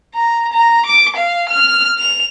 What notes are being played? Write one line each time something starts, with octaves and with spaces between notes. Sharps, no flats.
A#5
A#5
D6
F5
F6
F7